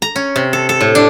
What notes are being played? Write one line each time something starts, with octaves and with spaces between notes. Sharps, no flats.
A#5
C#4
C3
A4
A4
A2
D4